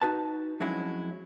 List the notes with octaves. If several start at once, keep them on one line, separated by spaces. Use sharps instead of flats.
D#4 F#4 B4 A5
F2 F#3 G#3 C#4 E4